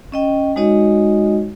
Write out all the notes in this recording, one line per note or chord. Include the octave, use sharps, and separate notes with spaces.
C#4 D#5 G5
G#3 D#4 F#4 C#5 D#5